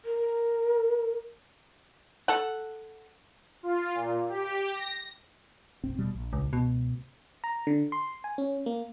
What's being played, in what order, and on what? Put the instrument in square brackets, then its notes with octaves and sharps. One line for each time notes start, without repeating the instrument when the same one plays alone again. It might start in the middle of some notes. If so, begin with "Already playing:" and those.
[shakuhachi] A#4
[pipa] A4 F#5
[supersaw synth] F4
A#2
G4
A#6
[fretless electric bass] F#1 B1 C4
D#1 B2 G3
A#1
[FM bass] C#2
[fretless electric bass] C#2 [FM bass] B2
[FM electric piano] A#5
D3
C6
G#5
C#4
A#3